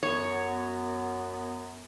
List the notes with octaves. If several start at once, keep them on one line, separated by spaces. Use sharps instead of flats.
F#2 B3 C#5